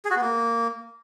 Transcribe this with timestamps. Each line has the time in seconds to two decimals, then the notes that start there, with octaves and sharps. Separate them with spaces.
0.05 G#4
0.11 F#4
0.16 B3
0.21 A#3